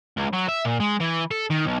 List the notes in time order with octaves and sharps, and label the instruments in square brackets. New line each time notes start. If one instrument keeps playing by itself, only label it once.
[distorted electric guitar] C#2
F#3
E5
A#2
G#3
E3
A4
D#3
B1